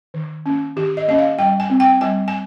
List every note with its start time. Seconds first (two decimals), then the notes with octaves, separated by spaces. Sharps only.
0.14 D#3
0.46 A#3 C#4
0.76 D#3 G4
0.97 D#5
1.08 A#3 C#4 D#5
1.18 F5
1.39 G3 G5
1.60 G#5
1.70 C4
1.80 G5
2.01 G3 G#5
2.28 G#5